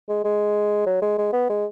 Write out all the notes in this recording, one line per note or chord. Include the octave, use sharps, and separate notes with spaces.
G#3
G#3
F#3
G#3
G#3
B3
G#3